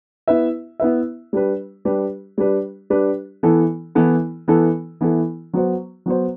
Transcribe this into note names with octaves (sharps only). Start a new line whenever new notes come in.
B3 E4 B4 E5
B3 E4 B4 E5
G3 D4 G4 B4
G3 D4 G4 B4
G3 D4 G4 B4
G3 D4 G4 B4
E3 B3 E4 A4
E3 B3 E4 A4
E3 B3 E4 A4
E3 B3 E4 A4
F#3 B3 F#4 C5
F#3 B3 F#4 C5